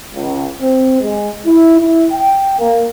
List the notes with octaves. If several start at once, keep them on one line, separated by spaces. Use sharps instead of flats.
C#2
C4
G#3
E4
E4
G5
A#3